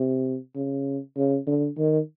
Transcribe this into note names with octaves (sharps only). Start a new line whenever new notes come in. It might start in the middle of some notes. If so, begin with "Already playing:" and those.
Already playing: C3
C#3
C#3
D3
D#3